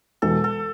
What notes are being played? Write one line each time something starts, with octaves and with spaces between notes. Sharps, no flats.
E1 A4
A4